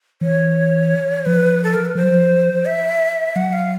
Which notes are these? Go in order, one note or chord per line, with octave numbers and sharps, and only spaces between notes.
E3 C#5
F3 B4
A4
A#4
B4
F3 C5
F#3
F3
E5
F#3 F#5
F5